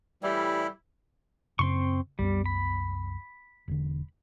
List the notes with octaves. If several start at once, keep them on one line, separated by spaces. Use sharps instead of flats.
A2 E3 G3 E4
F#2 C#3 C4 C6 C#6
C2 F#2 G3 B3
B5
E1 D3